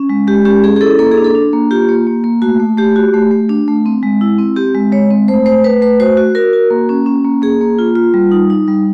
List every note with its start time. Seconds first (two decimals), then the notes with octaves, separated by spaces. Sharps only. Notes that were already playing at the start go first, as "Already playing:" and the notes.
Already playing: C#4
0.09 G#3
0.27 G#3 G4
0.45 C#4 G4
0.63 C#4 G#4
0.76 G#4
0.81 E4 A4
0.99 A#3 A4
1.11 G#4
1.17 D4
1.24 A4
1.35 D4
1.53 A#3
1.71 F4 G4
1.89 A#3
2.07 A#3
2.24 A#3
2.42 A3 F#4
2.60 A3
2.77 A3 G4
2.96 F#4
3.14 A3
3.31 A3
3.49 D4
3.68 A3
3.86 C4
4.03 G#3
4.21 E4
4.38 C4
4.56 C4 G4
4.75 G#3
4.92 G#3 C#5
5.10 C4
5.28 A3 C5
5.46 A3 C5
5.63 A3 B4
5.82 A3 B4
6.00 F#4 C5
6.17 F#4
6.35 F#4 A#4
6.53 F#4
6.70 A#3
6.89 C#4
7.06 C#4
7.25 A#3
7.42 A#3 G#4
7.61 A#3
7.79 F4
7.96 F4
8.14 G3
8.31 D#4
8.50 D#4
8.68 G3